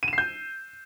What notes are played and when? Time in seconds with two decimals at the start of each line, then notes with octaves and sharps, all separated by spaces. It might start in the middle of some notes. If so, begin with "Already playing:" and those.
0.03 D#7
0.08 E7
0.13 C7
0.18 G6